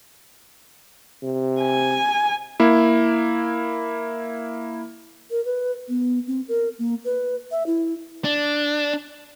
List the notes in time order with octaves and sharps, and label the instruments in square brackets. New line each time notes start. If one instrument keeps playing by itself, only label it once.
[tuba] C3
[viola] G#5
[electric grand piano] A#3 E4
[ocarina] A#4
B4
B3
C4
A#4
A#3
B4
E5
E4
[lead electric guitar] D4